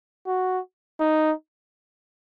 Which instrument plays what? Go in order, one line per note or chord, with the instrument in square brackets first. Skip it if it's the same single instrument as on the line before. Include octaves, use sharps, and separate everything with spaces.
[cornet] F#4
D#4